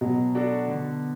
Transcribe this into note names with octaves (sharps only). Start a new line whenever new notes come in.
B2 F#3
D4 F#4 A4 D5
D3